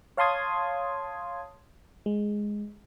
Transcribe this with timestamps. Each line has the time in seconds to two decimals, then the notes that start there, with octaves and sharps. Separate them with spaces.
0.17 C#5 F5 A5 C6 D#6 G#6
2.06 G#3